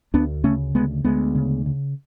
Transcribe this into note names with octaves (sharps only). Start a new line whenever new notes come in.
D2 B3 D4
C#3 A3 C#4
D2 G#3 B3
D2 G#3 B3
C#3
C#3